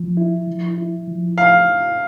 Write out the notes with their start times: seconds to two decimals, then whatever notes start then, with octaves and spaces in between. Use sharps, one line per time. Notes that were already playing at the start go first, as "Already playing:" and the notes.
Already playing: F3
0.17 E4
0.47 F3
0.78 E4
1.08 F3
1.37 E4 F5